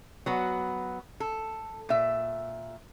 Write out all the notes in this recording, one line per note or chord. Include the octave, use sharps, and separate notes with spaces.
F#3 B3 F#4
A4
A#2 E5